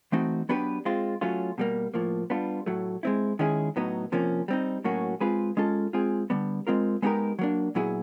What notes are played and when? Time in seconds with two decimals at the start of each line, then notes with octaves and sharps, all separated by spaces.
0.12 E3 A3 C4 D#4 F#4
0.49 F#3 B3 D4 G4 B4
0.85 G#3 C4 F4
1.21 F#3 A3 C#4 F4
1.58 B2 G3 A#3
1.94 A2 F3 A#3
2.30 G3 B3 D4 F4
2.66 A2 F#3 A3
3.03 G#3 C4 E4
3.39 D#3 G#3 C#4 E4 G#4
3.76 A2 F#3 B3 D#4
4.12 C3 F3 A#3 C#4
4.48 G3 C4 D#4
4.84 A2 F#3 A#3 C#4 F#4
5.20 G#3 C4 F4 G#4 B4
5.57 G#3 C#4 F4 A4
5.93 G#3 C4 F4 G#4
6.30 D3 G3 B3
6.67 G#3 C4 F4 A#4
7.02 G#3 B3 D#4 G4 A#4
7.39 F#3 A#3 D4
7.75 A#2 F#3 B3 E4 G#4